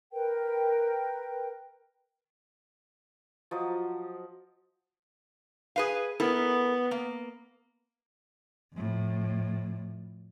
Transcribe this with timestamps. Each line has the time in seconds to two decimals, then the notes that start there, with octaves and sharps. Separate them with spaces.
0.12 A#4 B4 G5
3.51 F3 F#3 D#5
5.76 G#4 B4 F5
6.20 B3 E4 A4 A#4
6.91 A#3
8.73 F2 A2